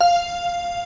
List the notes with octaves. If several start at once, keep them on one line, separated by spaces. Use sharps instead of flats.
F5